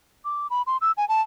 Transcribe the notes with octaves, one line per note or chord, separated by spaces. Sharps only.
D6
B5
C6
E6
G#5
A5